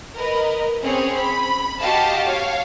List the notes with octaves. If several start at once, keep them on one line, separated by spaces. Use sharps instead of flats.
A#4 B4 D#5
C4 C#4 G#4 C#5
B5
F#4 G4 D#5 F5 A5
C#5 F5